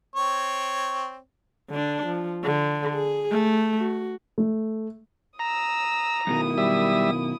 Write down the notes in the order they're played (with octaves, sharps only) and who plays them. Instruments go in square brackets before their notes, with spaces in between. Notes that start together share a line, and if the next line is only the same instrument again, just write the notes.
[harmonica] C4 C#5
[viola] D3 D4
F3
D3
G#4
A3
F#4
[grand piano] A3
[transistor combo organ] A#5 [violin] D#6 E6
[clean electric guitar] F#2 B2 D#3 [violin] E4 D#6
[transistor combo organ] G3 E5